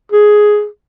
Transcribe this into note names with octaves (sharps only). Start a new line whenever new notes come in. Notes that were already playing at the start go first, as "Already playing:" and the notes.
G#4